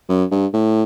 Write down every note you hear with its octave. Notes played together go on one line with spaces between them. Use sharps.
F#2
G2
A2